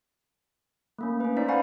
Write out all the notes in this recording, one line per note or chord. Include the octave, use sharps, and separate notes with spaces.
A3 A#3 C#4
C#4 B4
C#4 D#4 C5 D5 B6
B4 F5 F#5 G#5 B5 C#6